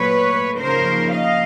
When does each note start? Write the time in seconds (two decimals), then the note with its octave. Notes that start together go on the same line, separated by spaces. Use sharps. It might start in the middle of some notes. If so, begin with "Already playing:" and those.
Already playing: A#2 F#3 A3 B4 C#5
0.60 C#3 F3 A#3 D#4 A#4 C5
1.13 D#5 F5